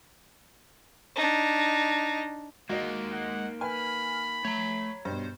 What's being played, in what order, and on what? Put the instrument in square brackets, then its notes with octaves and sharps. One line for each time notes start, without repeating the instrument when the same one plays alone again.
[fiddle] D4 D#4
[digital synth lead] G#3 [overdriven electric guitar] A#3 D#4 [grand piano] F#4 D#5
[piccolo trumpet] F#5
[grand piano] B4 G#5 [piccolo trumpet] B5 [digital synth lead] F6
[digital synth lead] A3 [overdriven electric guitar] C#5 A#5
[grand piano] G2 B2 [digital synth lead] C5